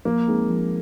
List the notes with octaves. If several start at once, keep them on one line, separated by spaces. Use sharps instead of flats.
F3 A#3
G#3 C4 D#4 G#4
F3